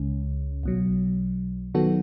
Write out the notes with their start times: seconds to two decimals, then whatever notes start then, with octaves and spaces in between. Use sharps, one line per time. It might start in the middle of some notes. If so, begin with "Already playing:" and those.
Already playing: C#2 C#3 G#3 C#4
0.63 B1 B2 F#3
1.75 D#3 F#3 B3 F#4 A4